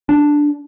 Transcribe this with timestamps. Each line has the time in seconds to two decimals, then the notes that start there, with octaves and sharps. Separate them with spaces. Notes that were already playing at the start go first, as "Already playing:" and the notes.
0.09 D4